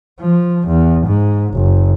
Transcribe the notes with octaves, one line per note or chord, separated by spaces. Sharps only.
F3
E2
G#2
F#1